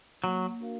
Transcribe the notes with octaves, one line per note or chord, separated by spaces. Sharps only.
F#3 A#3
D4 F#4 A#4 F5